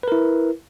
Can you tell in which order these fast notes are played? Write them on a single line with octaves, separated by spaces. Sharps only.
B4 A#4 E4